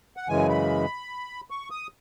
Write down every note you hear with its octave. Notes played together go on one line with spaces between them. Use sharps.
F#5
F#2 C#3 E3 G#3 G#5
B5
C#6
D#6